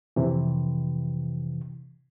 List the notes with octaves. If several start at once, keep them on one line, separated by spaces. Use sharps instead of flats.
F2 C3 E3